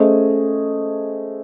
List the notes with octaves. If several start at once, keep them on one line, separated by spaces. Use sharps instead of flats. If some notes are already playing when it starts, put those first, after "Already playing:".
Already playing: A3 C#4 G#4 C5 D#5